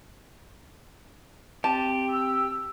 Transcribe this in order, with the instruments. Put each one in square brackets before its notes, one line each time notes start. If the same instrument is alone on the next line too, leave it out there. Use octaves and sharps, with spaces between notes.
[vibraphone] C4 [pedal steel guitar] G4 [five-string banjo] A5
[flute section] E6